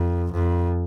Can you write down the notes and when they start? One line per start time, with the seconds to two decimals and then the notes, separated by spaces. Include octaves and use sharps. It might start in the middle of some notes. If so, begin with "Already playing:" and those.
Already playing: F2
0.32 F2